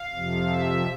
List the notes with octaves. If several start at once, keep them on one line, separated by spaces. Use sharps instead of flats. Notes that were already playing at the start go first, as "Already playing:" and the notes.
Already playing: F5
F2 C3 F3
E5